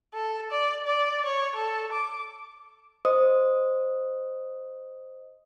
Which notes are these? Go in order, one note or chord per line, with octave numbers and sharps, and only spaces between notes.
A4
D5
D5
C#5
A4
D6
C5 D#5 D#6